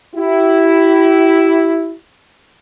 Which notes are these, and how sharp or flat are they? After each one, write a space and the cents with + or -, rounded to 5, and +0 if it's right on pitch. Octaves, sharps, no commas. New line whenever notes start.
E4 +0 G4 -35